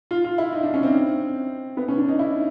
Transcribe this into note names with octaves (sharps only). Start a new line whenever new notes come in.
F4
F4
E4
D#4
D4
C#4
C4
B3
C#4
D4
D#4
E4